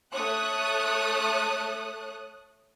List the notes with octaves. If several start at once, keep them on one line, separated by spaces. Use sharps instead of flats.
A3 C#5 D#6 F#6